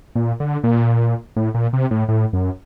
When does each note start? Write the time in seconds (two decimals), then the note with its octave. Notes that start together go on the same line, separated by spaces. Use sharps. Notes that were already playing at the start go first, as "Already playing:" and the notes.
0.15 A#2
0.40 D3
0.64 A#2
1.37 A2
1.54 A#2
1.73 C3
1.91 A2
2.09 A2
2.33 F#2